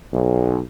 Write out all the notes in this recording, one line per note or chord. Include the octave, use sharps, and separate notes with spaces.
B1